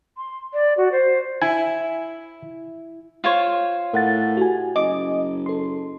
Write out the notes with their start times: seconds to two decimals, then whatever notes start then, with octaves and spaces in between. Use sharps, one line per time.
0.17 C6
0.54 D5
0.77 F#4
0.92 C5
1.42 E4 G#5
3.24 F4 C5 C#5
3.93 A2 A#4 F#5 A6
4.37 F#4 G4 G#5
4.76 F#1 D#5 D6
5.46 A4 C6